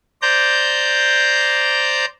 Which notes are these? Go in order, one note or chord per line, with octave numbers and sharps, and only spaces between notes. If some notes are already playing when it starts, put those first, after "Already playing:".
C5 D5 A#5 G6